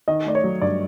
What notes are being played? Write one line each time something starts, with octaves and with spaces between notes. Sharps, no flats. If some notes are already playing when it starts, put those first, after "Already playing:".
D#3 D#5
A3 D5
C#5
F#3
G2 D5